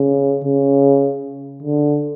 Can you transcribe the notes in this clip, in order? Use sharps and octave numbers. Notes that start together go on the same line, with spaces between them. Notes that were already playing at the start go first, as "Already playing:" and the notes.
Already playing: C#3
C#3
D3